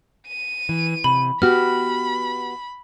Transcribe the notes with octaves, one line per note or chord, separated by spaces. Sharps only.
D#7
E3
C3 B5
B3 F#4 G4 B5 F6